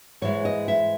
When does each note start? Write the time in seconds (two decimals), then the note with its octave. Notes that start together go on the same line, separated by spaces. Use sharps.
0.22 G#2 E3 G#3 C#5
0.45 D#5
0.68 E5